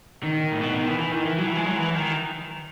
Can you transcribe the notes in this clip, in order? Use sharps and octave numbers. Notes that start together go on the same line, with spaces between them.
D#3
A2
B2
D#3
E3
E3
D#3
E3
F#3
E3
G#3
F#3
E3
D#3